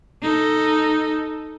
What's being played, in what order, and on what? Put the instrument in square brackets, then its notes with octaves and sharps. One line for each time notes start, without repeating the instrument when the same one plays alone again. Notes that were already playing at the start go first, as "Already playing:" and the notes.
[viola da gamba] D#4 A4